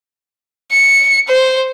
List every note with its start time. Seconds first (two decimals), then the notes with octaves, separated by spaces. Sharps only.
0.72 C#7
1.28 C5